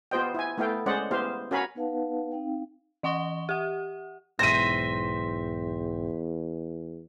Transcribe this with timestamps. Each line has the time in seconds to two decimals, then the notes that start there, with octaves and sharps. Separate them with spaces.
0.11 B3 F4 G4 C5 D#5 G5
0.34 E4 G#5
0.58 A3 B3 E4 A4 F5 G5
0.86 G#3 C#4 C5 D5 D#5 F#5
1.11 B3 E4 G4 C5 F5
1.51 C#4 F#4 A#4 F5 G#5 B5
1.75 B3 D#4 B4 F5 F#5 A5
2.32 C4 D#4 F5 G5
3.03 E3 D#5 F#5 C#6 G7
3.49 G4 F#5
4.39 B1 E2 G#2 C5 E5 G5 A#6 D#7